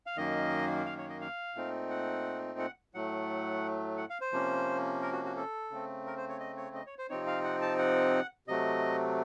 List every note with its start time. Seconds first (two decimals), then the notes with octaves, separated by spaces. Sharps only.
0.06 F5
0.17 F#2 D#3 A#3 D#5
0.86 F5
0.98 C#5
1.09 D#5
1.21 F5
1.55 A#2 A3 C4 D#4
1.90 F#5
2.59 F#5
2.95 A2 F#3 A3 F#5
3.98 F#5
4.10 F5
4.21 C5
4.32 C3 F3 A#3 C#4
5.02 A#4
5.13 F#4
5.25 F#4
5.36 A4
5.71 C#3 A3 C4
6.06 A#4
6.17 C5
6.29 C#5
6.40 D#5
6.57 C#5
6.75 D#5
6.86 C#5
6.98 C5
7.10 C3 F3 C4 D#4 C#5
7.27 F5
7.44 F#5
7.62 A5
7.78 F#5
8.47 C3 F#3 A3 D#5